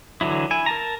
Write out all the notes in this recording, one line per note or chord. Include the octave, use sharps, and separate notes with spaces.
D3 E3 F#3 E4
E4 G#5
A#4 A5 A#5